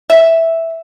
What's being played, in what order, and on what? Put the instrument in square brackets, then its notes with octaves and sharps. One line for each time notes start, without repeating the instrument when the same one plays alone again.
[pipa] E5